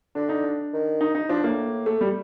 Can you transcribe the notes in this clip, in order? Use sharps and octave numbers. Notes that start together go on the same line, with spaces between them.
D3 D4
D#4
D4
D#3
D#4
D#4
F3 D4
A2 A#3
A3
G3